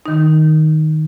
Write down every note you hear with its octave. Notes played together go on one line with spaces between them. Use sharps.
D#3 D#4